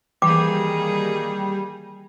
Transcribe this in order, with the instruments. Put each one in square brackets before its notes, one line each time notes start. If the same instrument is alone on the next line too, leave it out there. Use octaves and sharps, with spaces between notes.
[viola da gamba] D#3 A#3 G#4 [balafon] E3 [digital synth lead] G3 [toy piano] D6